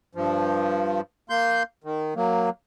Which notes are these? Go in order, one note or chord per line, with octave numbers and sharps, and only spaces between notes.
G2 F3
A#3 C6 G6
D#3
F#3 A#3